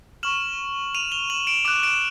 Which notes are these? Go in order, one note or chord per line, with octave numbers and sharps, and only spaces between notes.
C#6 F6 E7 F#7
D#7 F7
F7 G7
E7 F#7
D7 E7
D6 F#6 D7 E7
D7 E7